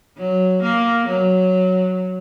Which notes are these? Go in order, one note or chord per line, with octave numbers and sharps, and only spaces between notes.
F#3
A#3
F#3